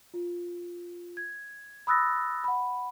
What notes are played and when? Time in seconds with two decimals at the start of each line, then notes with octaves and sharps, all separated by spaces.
0.14 F4
1.17 G#6
1.87 B5 D#6 E6 F#6 A6 A#6
2.44 F#5 B5